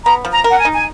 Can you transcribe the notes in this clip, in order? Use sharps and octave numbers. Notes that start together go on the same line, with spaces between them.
B3 A#5
F3
A#5
A#4
F#5
G#5
D#4
G#5